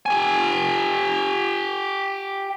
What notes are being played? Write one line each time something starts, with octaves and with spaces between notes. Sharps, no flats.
G4 G#5